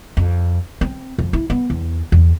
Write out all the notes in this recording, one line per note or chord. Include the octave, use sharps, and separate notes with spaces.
F2
C4
F2
E4
B3
E2
E2